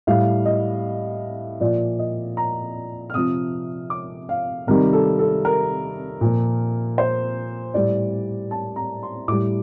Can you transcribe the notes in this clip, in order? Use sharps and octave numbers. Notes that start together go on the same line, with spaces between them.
A2 G3 F5
D#5
A#2 F3 D5
D#5
A#5
F6
C3 F3 D#6
D6
F5
C3 D#3 G3 A#4
A4
A4
A#4
A#2 F3
C5
A2 G3 D5
A5
A#5
C6
A2 G3 D6